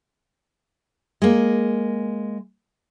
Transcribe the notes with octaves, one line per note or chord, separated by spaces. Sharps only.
G#3 A#3